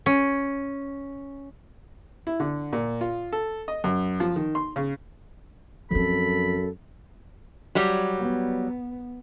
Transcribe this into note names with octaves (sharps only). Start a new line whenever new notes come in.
C#4
E4
D3
A#2
F4
A4
D#5
F#2
F3
D#3
C6
C#3
F#2 F3 C4 A4 B5
F#3 G3
B3